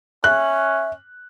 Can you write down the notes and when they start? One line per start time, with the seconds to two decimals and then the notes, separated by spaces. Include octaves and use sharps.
0.24 C#4 E5 F#6